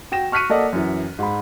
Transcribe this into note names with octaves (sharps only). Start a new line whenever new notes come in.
F#4 G5 A#6 E7
C#6 F6 F#6 B6 C#7 D#7
A#3 A4 D5 D#5 F#5
F#2 E3
G#2 B5